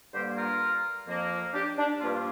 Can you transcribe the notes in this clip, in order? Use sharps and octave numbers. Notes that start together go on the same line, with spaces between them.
G2 D3 G3 A#3 G4 C5
F4 A#4
F2 F3 A#3
D4 G4
D4
G2 F3 A#3 F4